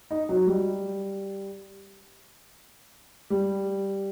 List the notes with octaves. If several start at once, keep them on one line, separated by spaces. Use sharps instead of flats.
D#4
F#3
G3
G3